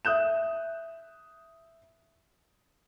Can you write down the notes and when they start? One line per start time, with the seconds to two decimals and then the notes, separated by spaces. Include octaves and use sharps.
0.05 E5 D#6 F#6 G6 E7